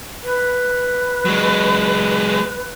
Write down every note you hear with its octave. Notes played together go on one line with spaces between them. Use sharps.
B4
F#3 G#3